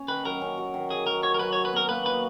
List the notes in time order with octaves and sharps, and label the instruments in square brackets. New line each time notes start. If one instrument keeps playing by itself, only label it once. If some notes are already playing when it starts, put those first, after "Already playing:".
Already playing: [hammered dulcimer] C#4
[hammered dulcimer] D#3 [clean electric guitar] B4
[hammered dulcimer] F#3 [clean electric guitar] A#4
[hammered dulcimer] C#4
F#3
D#3
[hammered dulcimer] F#3 [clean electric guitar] G#4
[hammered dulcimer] F#3 [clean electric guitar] A#4
[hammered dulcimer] F#4 [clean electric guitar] C#5
[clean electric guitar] A#4
[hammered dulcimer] F#3 [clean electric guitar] B4
[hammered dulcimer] F#3 [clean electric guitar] C#5
[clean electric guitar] B4
[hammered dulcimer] B3 [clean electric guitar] A#4
[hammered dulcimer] A#3 [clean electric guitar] B4
[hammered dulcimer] D#4 [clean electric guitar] B4